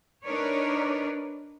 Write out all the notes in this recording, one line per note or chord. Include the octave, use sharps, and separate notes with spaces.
D4 D#4 A#4 B4 C#5 D5